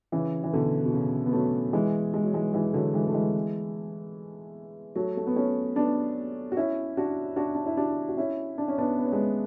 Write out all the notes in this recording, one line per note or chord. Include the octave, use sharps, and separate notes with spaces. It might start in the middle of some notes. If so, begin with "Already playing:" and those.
C#3 E3
E3
B2 D3
B2
C#3
B3
F#3 A3
E3 G#3
G#3
F#3
E3 G#3
E3 G#3
D3 F#3
E3 G#3
A3
E3 G#3
F#3 A3
A3
B3
A3 C#4
B3 D4
F#4
C#4 E4
D4 F#4
D4 F#4
D4
E4
D4 F#4
F#4
C#4 E4
D4
C#4
B3 D4
B3
C#4
G#3 B3